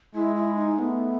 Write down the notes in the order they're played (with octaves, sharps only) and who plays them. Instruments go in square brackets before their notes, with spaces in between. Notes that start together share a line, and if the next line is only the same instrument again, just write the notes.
[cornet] G#3 [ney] E4
[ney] E4
D#4
[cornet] A3 [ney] B3 D#4